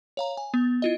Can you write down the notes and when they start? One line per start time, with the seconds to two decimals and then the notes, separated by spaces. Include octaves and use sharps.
0.17 C#5 F5 A#5
0.37 G#5
0.54 B3
0.82 E4 F4 D#5